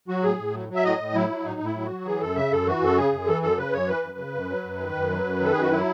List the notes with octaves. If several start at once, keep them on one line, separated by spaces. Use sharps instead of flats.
F#3 F#4
A2 G#4
A2
F#3
F#3
E5
A2 D#5
A2
F#3 E4
F#3
A2 D#4
A2
E4
F#3
F#4
F#3
E3 G#4
F#2 A4
C#3 E5
F#2 A4
E3 F#4
F#2 A4
C#3 G#4
F#2
E3 A4
F#2 A4
C#3 B4
F#2 C#5
E3 B4
F#2
C#3
F#2
F#3
F#2
D#3
F#2
F#3
F#2
D#3 A4
F#2 G#4
F#4
F#3 E4